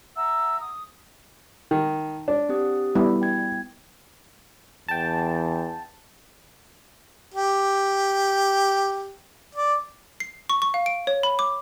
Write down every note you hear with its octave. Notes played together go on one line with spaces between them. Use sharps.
E5 F#5 A#5 E6
D#6
D#3 D#4
D4
C4 G4 D#6
G3 B3 E4
G5 G#6
E2 G5 A5
G4
D5
C7
C#6
C#6
F5
D7
C#5
B5
D6